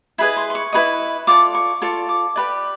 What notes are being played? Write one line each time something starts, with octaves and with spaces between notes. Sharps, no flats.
E4 G#4 B4 D#5 B5
C6
C6
C#6
E4 G#4 B4 D#5
F4 A4 D5 D6
C#6
F4 A4 D5 C#6
D6
G4 B4 D5